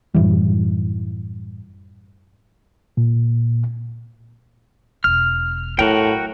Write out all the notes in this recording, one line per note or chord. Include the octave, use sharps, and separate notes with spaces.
F#2 A2 E3 G3
A#2
E1 F6
A2 F#3 F#4 A#4 G5